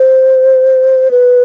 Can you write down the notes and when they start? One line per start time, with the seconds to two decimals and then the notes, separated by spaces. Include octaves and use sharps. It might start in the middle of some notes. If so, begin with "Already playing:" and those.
Already playing: C5
1.11 B4